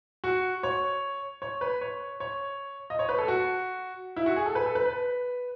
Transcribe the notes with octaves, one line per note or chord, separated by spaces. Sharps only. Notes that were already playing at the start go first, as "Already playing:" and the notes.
F#4
C#5
C#5
B4
C#5
C#5
D#5
C#5
B4
A4
F#4
E4
F#4
G#4
A4
B4
A4
B4
B4